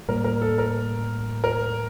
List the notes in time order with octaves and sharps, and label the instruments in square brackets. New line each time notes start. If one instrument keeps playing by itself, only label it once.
[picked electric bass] A2 G3 A#3 [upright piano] A#4
[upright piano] A#4
A4
A#4
A#4